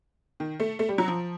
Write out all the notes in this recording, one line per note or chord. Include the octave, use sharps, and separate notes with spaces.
D#3
A3
A3
G3
F#3
F3